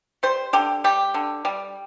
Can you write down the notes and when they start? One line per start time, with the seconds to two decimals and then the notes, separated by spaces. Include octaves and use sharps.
0.23 G3 C5
0.53 D3 G4
0.84 G3 G4
1.14 D3
1.45 G3